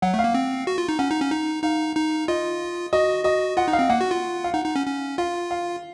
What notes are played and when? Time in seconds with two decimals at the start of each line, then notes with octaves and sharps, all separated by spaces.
0.02 F#3 F#5
0.14 A3
0.19 F5
0.24 A#3
0.34 C4
0.67 F#4
0.78 F4
0.89 D#4
0.99 C#4 F#5
1.10 D#4
1.21 C#4
1.31 D#4
1.63 D#4 F5
1.96 D#4
2.28 F4 D#5
2.93 F#4 D#5
3.25 F#4 D#5
3.57 F4 F#5
3.68 D#4
3.73 F5
3.79 C4
3.89 A#3 F#5
4.01 F#4
4.11 F4
4.44 F5
4.54 D#4 F#5
4.65 D#4
4.76 C#4
4.86 C#4
5.18 F4 F5
5.51 F5